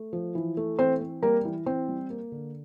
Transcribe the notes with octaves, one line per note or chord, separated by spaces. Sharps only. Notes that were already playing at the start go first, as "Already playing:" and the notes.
Already playing: A3
F3
E3
A3
E3 C4 C5
C4
G3 A#3 A#4
E3
E3 C4 C5
G3
A#3
D3